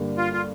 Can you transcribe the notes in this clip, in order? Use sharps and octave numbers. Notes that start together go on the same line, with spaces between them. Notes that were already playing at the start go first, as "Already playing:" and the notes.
Already playing: G2 D3 G3 A#3
F4
F4